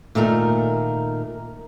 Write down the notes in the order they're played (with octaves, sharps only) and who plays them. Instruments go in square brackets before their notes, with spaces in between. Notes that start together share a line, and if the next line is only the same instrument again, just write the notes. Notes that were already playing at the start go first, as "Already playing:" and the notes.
[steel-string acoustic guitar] A#2 D#3 A3 A#4